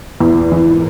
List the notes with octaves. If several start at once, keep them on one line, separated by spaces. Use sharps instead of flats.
E2 A#2
G#2 E3